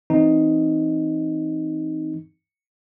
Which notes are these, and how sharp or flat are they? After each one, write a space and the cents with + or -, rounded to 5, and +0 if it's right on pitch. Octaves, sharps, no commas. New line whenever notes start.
E3 +0 C4 +0 D#4 +0